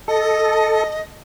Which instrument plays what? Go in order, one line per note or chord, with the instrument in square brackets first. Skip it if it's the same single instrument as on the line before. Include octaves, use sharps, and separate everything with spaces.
[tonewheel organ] A4 [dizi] D#5